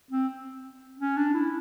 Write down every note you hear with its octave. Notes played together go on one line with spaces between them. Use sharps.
C4
C#4
D4
E4